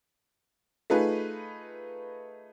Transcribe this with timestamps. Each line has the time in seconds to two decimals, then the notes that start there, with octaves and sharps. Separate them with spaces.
0.90 A3 D#4 F4 G#4 B4